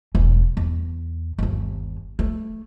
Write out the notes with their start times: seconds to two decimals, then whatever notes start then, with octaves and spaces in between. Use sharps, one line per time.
0.15 E1 C#4
0.57 E2
1.38 G1 D#2
2.19 A3